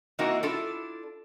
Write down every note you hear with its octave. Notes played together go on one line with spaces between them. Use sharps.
E3 A#3 C4 D#4 E4 F#4
D4 E4 F4 A4